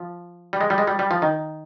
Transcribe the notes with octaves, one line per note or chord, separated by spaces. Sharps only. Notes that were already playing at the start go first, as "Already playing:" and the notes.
Already playing: F3
G3
G#3
G3
G#3
G3
G3
F3
D#3